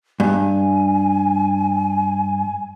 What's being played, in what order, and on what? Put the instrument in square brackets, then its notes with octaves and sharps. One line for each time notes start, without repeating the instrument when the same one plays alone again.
[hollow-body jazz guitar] G2 [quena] G#5